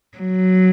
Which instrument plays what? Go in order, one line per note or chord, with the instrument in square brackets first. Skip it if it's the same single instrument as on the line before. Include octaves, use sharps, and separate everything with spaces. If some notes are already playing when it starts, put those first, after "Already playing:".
[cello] F#3